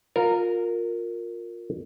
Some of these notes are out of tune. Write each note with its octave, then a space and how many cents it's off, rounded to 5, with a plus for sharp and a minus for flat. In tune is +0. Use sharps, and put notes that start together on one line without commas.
F4 +20 A#4 -10